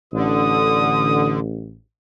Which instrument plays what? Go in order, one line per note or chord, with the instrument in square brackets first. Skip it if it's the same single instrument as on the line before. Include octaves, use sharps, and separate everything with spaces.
[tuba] A1 [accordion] D3 [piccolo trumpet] D#6